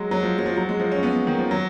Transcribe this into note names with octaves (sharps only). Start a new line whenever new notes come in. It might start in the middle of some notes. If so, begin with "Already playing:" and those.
Already playing: F#3 G#3
F#3
F3
F#3
F3
F#3
G#3
F3
C#4
B3
D#3
F3
F#3